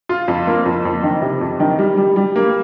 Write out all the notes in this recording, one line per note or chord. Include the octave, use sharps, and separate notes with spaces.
F4
F2
A#3
F2
F2
D#3
C3
F2
D#3
G3
G3
G3
A#3